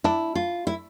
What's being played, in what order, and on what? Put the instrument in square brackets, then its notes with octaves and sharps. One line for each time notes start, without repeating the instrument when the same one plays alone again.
[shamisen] D4 [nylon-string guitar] E4
[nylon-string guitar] F4
E4